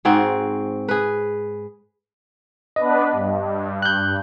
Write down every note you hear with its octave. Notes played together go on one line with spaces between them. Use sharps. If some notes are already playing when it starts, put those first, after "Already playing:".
G#2 C4 F#4 G#4
G#4 B4
B3 D4 B4 D#5
G2
F#6 G6